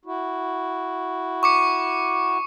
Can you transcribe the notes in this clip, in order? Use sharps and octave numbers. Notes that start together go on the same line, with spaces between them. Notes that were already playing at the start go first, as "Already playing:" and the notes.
E4 F#4
C#6 D6 C#7